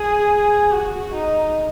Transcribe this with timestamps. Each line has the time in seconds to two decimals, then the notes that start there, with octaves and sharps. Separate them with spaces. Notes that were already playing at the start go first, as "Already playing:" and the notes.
Already playing: G#4
0.72 F#4
1.14 D#4